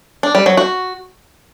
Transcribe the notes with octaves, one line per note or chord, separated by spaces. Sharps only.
D4
G3
F#3
F#4